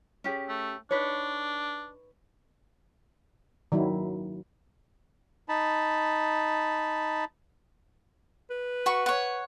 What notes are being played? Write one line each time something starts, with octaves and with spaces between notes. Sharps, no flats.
C#4 G4 G#4
A3
D4 D#4 B4 C#5
D#3 F#3 E4
D#4 A5 B5
B4
F#4 B5 C#6
C#5 F#5